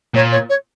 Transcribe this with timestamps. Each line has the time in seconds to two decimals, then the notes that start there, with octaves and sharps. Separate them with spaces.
0.14 A#2 C#5
0.31 C#5
0.49 C#5